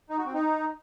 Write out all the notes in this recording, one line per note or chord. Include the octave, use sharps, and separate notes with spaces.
D#4
F#4
C4
D#4